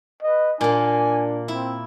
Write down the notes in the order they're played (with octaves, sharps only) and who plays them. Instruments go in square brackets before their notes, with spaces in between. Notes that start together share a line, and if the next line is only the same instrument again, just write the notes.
[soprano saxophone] B4 [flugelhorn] D#5
[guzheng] A#2 A#3 [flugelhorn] D4 [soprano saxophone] G#5
[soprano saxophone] C4 [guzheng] E4